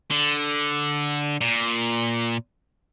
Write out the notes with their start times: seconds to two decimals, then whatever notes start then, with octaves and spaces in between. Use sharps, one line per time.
0.11 D3
1.41 A#2